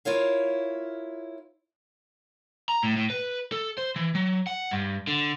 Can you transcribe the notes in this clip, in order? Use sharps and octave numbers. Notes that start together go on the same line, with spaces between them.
E4 F4 A#4 C#5 F5
A#5
A2
A2
B4
A4
C5
E3
F#3
F#5
G2
D3